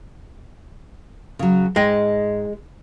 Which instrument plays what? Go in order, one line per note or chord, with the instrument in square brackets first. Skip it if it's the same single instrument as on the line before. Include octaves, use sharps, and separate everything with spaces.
[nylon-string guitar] C#3 F#3
[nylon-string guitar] G#2 D#5 G5 [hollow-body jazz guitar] G#3